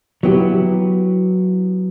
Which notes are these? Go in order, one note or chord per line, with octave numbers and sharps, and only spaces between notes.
F#3 B3 E4 G4